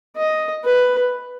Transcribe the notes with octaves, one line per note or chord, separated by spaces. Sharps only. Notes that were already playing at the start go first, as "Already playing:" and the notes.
D#5
B4